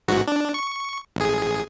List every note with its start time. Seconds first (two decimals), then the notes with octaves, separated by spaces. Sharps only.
0.08 A1 G#2 F#4
0.27 D4
0.54 C#6
1.16 A1 G#4